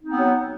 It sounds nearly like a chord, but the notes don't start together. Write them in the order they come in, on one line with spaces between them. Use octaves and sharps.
D#4 C4 B3 F#3